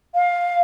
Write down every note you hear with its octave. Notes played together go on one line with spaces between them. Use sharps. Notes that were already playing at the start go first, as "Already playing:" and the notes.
F5